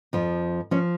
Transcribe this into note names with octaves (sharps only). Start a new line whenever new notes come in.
F2 F3
F3 C#4